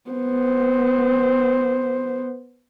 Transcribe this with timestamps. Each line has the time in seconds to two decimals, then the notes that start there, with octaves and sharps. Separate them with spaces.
0.10 B3 C5